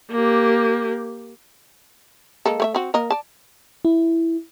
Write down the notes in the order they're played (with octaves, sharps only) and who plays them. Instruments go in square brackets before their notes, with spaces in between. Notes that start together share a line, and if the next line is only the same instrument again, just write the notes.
[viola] A#3 G4
[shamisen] G#3 A#3 A4
A3 C#5 E5
C4 F#4
A#3 A#4 D#5
D5 A5
[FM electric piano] E4